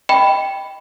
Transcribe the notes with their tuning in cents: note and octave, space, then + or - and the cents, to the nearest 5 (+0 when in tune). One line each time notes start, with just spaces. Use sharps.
D#5 +0 G5 +0 B5 +10